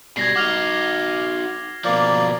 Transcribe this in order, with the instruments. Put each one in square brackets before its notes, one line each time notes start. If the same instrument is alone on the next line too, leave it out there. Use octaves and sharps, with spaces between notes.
[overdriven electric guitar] B2 G3 [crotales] G#6 A#6 C7
[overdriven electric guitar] D#4 F#4 [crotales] D6 F6 F7
[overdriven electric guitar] B2 F3 [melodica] A#3 D5